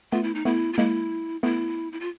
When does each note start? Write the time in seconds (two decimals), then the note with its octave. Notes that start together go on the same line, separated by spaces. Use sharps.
0.12 A3 B3 F4
0.23 E4
0.35 D#4
0.45 A3 B3 E4
0.73 F4
0.78 G#3 A#3 E4
1.43 A3 B3 E4
1.92 E4
2.00 F4